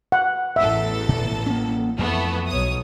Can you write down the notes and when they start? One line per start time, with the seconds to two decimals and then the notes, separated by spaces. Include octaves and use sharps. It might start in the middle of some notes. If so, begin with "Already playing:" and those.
0.12 F#5
0.56 A1 E2 A4 E5
1.09 A#2
1.46 A#3 C#4
1.99 F2 E3 A3 B3
2.48 B1 C#5 D#6